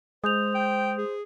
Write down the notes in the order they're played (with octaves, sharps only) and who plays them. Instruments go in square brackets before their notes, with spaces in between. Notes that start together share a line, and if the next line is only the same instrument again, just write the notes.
[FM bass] G#3 [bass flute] C5 [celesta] D#6 G6 F7
[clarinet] G5
G#4